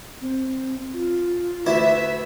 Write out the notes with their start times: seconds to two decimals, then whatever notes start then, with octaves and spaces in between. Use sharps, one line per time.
0.21 C4
0.94 F4
1.66 D2 E4 B4 E5